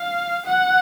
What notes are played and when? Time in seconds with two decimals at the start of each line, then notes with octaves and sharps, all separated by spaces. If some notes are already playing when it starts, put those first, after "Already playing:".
Already playing: F5
0.45 F#5